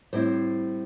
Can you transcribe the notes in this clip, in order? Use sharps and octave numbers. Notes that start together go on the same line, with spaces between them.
A2 G3 C4 E4 C5